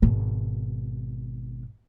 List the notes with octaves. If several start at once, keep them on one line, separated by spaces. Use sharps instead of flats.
G#1 B2